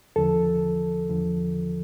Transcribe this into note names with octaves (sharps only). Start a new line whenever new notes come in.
E2 D3 F3 A4
E2 D3 F3